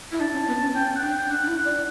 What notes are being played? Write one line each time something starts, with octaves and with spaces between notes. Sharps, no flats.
E4
D4 A5
C#4
B3
C#4
C#4 G5
G5
F#5
D4 G5
G5
D4 F#5
D4
E4
F#5
D5